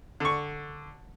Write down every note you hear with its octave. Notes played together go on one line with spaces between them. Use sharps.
D3 C#6